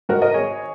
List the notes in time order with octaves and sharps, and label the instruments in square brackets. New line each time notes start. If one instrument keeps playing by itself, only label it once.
[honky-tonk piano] G#2 F#4 A#4
G#3
A#4 D#5
G#1 G#4 C#5